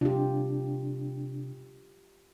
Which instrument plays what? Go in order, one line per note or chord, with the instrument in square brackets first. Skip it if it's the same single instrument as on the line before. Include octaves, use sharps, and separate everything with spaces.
[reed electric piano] C3 D4 [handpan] F4 G4